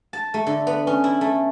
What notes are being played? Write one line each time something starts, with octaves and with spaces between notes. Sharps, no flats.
A5
A3
D3
B3
C#4
E4
A3